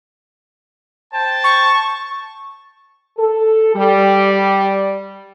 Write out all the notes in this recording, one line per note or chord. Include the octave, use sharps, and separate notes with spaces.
C5 G5 A5
C#6
A4
G3